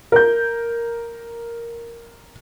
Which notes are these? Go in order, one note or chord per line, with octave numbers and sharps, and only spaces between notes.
A#4 G6